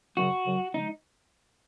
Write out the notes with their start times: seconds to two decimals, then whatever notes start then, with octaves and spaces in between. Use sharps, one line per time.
0.17 F#2 C#3 F#3 F#4
0.46 F#2 C#3 F#3
0.73 C#3 F3 G#3 D#4